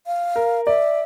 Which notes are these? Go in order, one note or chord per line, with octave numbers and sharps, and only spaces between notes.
F5
A#4
D5 E5